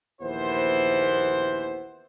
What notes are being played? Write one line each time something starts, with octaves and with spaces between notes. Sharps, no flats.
A#1 D#2 E3 B3 E4 C5